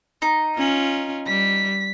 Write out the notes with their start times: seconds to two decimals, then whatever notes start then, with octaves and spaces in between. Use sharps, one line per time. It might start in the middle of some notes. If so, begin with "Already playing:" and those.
0.22 D#4
0.56 C#4 F4
1.26 G3 B6